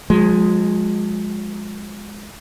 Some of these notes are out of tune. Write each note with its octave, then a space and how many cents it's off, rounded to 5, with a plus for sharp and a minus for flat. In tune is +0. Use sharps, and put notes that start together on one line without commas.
F3 +40 G#3 +0